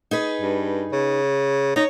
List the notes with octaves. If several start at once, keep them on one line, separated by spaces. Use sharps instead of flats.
D#4 G#4 B4
G2
C#3
D#4 C#5